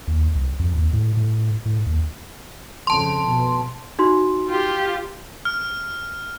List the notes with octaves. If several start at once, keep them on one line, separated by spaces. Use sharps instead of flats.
D#2
C2
F2
D#2
A2
A2
A2
D#2
F2 C#3 A5 C6
B2
D#4 F#4 C6
F4 G4
F6